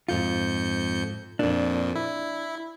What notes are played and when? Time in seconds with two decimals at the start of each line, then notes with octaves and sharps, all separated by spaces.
0.08 F2 G#2 F4 G6 C#7
1.39 F2 A#2 D4
1.95 E4